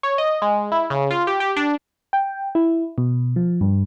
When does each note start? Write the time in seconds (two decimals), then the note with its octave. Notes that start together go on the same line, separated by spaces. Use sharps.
0.03 C#5
0.18 D#5
0.42 G#3
0.72 E4
0.90 C#3
1.11 F4
1.27 G4
1.40 G4
1.56 D4
2.13 G5
2.55 E4
2.98 B2
3.36 F3
3.61 G2